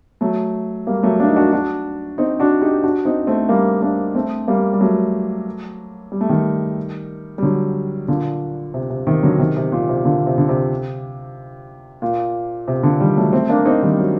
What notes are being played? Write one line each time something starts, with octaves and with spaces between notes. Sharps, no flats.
F#3 A3
G3 A#3
F#3 A3
A#3 D4
D#4
D4 F#4
D4 F#4
C4 D#4
D4 F#4
D#4 G4
D4 F#4
C4 D#4
A3 C4
G3 A#3
A#3 D4
A3 C4
G3 A#3
G3
F#3 A3
G3
A3
D#3 G3
G3
D3 F#3
A#2 D3
C3
C3
C3 D#3
D3 F#3
C3 D#3
C3
A#2
C3
A#2 D3
C3
D3
C3
A#2
C3
A#2 D3
D#3 G3
F#3 A3
A3 C4
A#3 D4
C4 D#4
D#3 G3
F#3